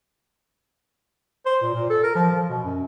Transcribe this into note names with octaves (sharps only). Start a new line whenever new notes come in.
C5
A#2
A#2
A4
A#4
F3
F3
B2
F#2